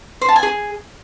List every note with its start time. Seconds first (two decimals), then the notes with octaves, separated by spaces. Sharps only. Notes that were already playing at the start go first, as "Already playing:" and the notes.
0.21 C5
0.29 A5
0.36 G#5
0.43 G#4